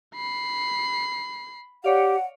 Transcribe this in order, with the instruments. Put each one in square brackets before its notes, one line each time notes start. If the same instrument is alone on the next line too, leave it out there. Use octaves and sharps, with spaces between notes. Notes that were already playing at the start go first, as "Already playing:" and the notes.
[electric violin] B5 C7
[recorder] G4 [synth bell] C#5 D5 F5 [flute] F#5